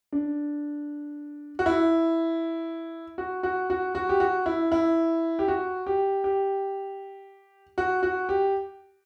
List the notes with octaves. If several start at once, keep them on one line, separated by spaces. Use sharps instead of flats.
D4
F#4
E4
F#4
F#4
F#4
F#4
G4
F#4
E4
E4
G4
F#4
G4
G4
F#4
F#4
G4